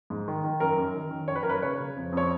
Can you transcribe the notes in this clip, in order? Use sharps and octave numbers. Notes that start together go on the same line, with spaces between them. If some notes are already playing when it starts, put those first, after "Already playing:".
G#2
D#3
D#3
F#2 A#4
F#2
D#3
D#3
F#2 C#5
B4
F#2 A#4
B4
C#3 C#5
C#3
F2
F2
C#5